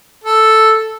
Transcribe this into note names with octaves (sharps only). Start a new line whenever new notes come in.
A4